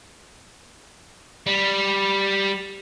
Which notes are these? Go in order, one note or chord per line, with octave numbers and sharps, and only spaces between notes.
G3